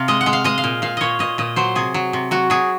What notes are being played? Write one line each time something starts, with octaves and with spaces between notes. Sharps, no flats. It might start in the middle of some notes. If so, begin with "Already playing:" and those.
Already playing: C3 F5
G#3 D#5
F#5
G#3
F5
G#3 D#5
F5
A#2
A#2 F5
A#2 C#5 D#5
A#2 D#5
A#2 D#5
F#3 C5
C3 G#4
F#3
C3
F#3 F#4
F#3 G#4